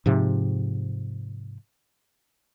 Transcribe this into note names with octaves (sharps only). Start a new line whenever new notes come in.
G#2 C3 F3